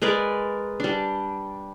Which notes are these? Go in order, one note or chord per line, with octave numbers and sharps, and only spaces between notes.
G#3 A#4 B4 D5
G3 D4